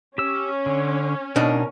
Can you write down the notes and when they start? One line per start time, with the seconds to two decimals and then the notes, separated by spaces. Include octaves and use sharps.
0.18 C#4 G4 E6
0.66 D3
1.36 B2 D4 D#4 A#4